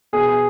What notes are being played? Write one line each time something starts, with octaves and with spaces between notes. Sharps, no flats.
B2 G#4